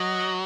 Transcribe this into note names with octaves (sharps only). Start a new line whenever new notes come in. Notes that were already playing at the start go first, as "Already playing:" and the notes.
Already playing: F#3 D#5